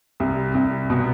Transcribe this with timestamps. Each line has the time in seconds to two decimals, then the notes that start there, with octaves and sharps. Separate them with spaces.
0.20 C2
0.55 C2
0.90 B2